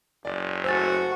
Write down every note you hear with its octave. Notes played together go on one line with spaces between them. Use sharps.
F#1 D5
A3 F#4 C5 G#5 E6 A6